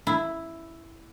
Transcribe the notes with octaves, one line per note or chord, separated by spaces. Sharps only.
E4